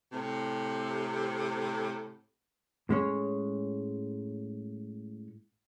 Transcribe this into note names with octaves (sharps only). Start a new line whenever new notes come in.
A2 C3
A2 G#3 C#4 C#5